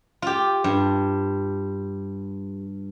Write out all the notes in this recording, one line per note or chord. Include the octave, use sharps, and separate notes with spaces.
F4 G4
G2